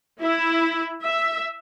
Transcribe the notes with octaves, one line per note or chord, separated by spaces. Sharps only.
E4
E5